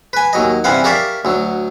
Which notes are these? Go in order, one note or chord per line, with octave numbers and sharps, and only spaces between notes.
B4 G#5
D#2 F#3 D#5
G2 C3 E3 F5 F#5
G4 A#4 C#5 D5 E5 F5
D2 F#3